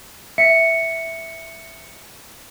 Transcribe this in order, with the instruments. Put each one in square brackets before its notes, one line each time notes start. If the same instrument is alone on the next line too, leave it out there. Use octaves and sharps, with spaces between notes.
[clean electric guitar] E5 [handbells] C#7